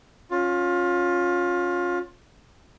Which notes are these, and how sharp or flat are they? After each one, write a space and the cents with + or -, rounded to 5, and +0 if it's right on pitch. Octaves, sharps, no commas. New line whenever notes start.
C#4 -5 F4 +20